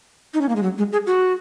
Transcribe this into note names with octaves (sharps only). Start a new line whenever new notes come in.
D#4
C#4
A#3
G#3
F#3
G#3
G#4
F#4